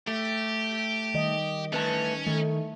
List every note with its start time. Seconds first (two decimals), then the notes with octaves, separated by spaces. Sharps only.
0.07 A3 G4
1.14 D#3 G3 D#5
1.72 A3 C#4 B4 A5
2.27 D#3 A3